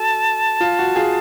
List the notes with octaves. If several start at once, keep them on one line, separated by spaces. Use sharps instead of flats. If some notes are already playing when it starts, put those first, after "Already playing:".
Already playing: F#4 A4 A5
F4
F#4
F4 G#4